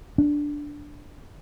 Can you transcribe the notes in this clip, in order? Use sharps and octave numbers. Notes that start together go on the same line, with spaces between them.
D4